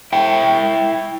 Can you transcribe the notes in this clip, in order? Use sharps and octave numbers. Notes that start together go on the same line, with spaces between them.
E4 G5